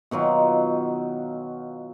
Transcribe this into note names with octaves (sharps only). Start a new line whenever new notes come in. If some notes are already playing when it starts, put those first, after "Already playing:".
B2 D#3 F#3 F4